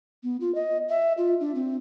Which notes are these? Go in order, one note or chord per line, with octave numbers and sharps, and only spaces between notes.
B3
F4
D#5
E5
F4
D4
C4